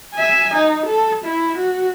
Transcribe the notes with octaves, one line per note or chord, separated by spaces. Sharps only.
E5 G#5
D#4
A4
E4
F#4